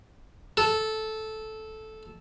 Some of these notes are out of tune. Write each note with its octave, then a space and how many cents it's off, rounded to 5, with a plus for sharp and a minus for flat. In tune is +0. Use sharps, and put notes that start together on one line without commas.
A4 -10